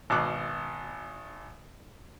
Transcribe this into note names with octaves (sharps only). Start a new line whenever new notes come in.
G#1 B2 D6 F#6